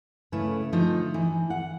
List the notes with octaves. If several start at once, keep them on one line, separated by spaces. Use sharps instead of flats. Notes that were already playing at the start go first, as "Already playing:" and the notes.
C#3 A3 C#4 E4 B4
D3 F3 A3 D#4
E3
F#5